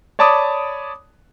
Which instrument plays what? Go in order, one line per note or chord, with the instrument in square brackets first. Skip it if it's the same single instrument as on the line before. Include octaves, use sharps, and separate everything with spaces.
[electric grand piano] C#5 D5 A5 B5 D6 D#6